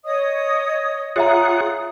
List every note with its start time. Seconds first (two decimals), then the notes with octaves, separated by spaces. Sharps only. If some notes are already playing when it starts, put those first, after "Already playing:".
0.04 C#5 D#5 D#6
1.16 F4 G#4 C#5 E5 F#5 A#5 D#6